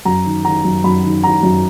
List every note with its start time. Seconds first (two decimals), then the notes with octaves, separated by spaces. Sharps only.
0.05 F#2 A#5
0.25 D#3
0.45 D#3 A#5
0.64 F#2
0.84 F#2 B5
1.04 D#3
1.23 D#3 A#5
1.43 F#2